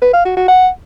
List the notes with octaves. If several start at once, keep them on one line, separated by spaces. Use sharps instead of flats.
B4
F5
F#4
F#4
F#5